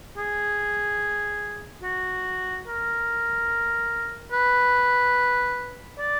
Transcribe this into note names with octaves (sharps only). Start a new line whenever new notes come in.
G#4
F#4
A#4
B4
D5